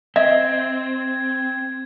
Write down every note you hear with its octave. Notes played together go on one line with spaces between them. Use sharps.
C4 D#5 E5 G#6